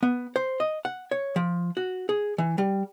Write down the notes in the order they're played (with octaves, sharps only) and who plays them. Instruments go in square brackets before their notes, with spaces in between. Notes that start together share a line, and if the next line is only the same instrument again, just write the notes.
[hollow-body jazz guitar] B3
C5
D#5
F#5
C#5
F3
F#4
G#4
E3
G3